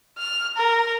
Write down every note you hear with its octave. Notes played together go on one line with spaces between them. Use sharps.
F6
A#4